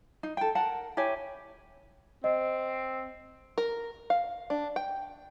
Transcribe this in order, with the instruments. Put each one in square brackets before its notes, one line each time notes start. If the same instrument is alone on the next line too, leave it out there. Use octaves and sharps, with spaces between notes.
[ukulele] D#4
A4 G5
A#4 F#5 A5
E4 G4 C#5 G#5
[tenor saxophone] C4 [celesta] D#5
[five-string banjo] A#4
F5
D4
G5